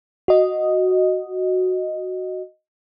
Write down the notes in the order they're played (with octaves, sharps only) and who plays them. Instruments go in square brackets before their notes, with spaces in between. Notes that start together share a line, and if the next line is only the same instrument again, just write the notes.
[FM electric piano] F#4 D#5